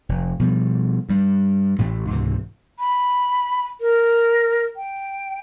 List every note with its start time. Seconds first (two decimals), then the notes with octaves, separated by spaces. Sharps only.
0.09 F1
0.39 B2 F3 G3
1.09 G2 G3
1.79 A1 A2 E3 A3
2.09 C#2 G#2 C3 E3
2.79 B5
3.81 A#4
4.76 G5